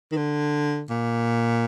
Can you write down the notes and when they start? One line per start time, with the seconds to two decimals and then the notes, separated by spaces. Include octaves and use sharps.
0.12 D#3
0.17 D3
0.90 A#2